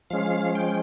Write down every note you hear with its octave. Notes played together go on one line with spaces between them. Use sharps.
F3 G#3 C#4 F5
G5